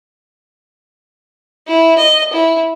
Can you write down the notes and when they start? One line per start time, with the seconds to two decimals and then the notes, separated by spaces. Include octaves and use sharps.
1.67 E4
1.98 D#5
2.33 E4